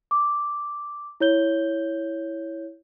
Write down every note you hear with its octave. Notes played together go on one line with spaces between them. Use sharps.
D6
E4 C#5 G6 G7